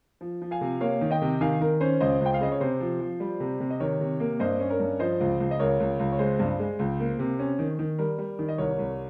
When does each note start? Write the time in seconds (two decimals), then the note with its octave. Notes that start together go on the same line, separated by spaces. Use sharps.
0.21 F3
0.42 F3
0.51 F5 G#5
0.61 C3
0.81 A#3 C#5 F5
1.01 D#3
1.11 D#5 G5
1.22 C3
1.41 D#3 F5 G#5
1.61 D#3 A#4
1.81 C#4 C5
2.00 C#2 C5 D#5
2.20 C#2
2.26 G5
2.34 F5
2.40 C#3 D#5
2.52 C#5
2.60 C3 C5
2.80 F3
3.00 F3
3.20 G3
3.40 C3
3.60 C3
3.70 D#5
3.80 D#3 A#4 C#5
4.00 C3
4.20 A#3
4.40 G2 C5 D#5
4.60 C#4
4.70 A#4 C#5
4.80 G2
4.99 F3 C5 D#5
5.20 C#2
5.40 C#2
5.51 D#5
5.59 C#2 A#4 C#5
5.80 C#2
5.99 C#2
6.12 C#5
6.19 G#3 C5
6.39 G2
6.59 G#3
6.79 C#2
7.00 A#3
7.19 C3
7.39 C#4
7.59 D#3
7.79 D#3
7.98 G3 A#4
8.18 G3
8.39 D#3
8.48 D#5
8.58 C2 A#4 C#5
8.79 C2